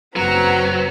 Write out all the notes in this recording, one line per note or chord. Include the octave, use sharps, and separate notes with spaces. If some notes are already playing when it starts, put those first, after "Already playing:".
F#1 F#3 C4 B4 F#5 A#5